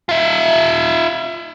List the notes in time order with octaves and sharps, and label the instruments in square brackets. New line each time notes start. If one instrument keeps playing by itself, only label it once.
[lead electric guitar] F4 E5